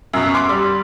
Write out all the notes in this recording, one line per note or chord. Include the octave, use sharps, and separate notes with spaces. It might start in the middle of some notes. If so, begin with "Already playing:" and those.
F#2 B2
C6 D6
G3